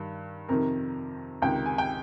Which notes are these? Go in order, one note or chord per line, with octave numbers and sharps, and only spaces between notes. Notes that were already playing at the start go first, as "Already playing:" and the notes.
Already playing: G2 D#3
F2 C3 D#3 A#4
C#2 C3 D#3 G5
G#5
G5